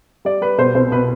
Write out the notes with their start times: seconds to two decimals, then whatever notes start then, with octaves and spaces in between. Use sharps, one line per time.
0.25 G3 D5
0.41 G3 B4
0.58 B2 C5
0.74 C2 C5
0.92 B2 B4